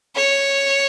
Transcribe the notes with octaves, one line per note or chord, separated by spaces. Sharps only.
C#5